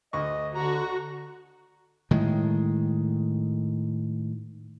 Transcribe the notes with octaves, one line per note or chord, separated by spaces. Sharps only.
D2 D#5 C#6
D3 F#4 A#5
A2 D#3 G#3